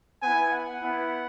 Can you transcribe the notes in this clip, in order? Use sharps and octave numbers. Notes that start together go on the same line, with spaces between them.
B3 E4 G#5
F#5
B3 E4